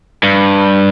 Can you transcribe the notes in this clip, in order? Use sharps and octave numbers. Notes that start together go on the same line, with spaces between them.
G2